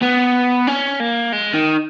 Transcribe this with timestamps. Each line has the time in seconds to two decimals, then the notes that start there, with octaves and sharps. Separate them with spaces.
0.02 B3
0.67 C#4
1.00 A#3
1.33 G#3
1.54 D#3